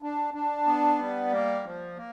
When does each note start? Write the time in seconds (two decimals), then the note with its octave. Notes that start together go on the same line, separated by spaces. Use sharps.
0.02 D4
0.34 D4
0.67 B3
0.99 G3
1.32 A#3
1.65 F3
1.97 A#3